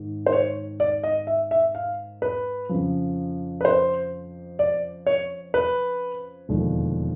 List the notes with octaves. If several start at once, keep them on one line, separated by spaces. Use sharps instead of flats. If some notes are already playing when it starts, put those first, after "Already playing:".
Already playing: G#2 D#3
C5
C#5
D5
D#5
E5
E5
F5
B4
F2 C#3 F3
B4
C5
D5
C#5
B4
E1 D#2 D3 F3